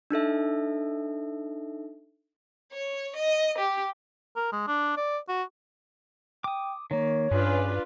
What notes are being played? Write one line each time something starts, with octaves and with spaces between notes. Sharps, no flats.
D4 D#4 A4 E5
C#5
D#5
G4
A#4
G#3
D4
D5
F#4
G5 D6 D#6
D#3 A#3 C#5
G2 C#4 D4 F4 G#4 B4